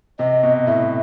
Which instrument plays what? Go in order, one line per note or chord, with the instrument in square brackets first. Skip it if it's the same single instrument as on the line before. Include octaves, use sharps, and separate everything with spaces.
[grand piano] C3 [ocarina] D#5
[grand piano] B2
[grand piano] A2 [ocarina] E5